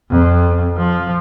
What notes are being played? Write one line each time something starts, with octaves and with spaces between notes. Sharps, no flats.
F2
F3